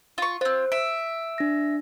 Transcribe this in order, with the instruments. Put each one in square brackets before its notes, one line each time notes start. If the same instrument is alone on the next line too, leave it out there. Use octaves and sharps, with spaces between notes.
[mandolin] F4 C#6
[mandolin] C4 F4 [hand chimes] C5
[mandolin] E5 [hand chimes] D7
[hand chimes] D4 A#6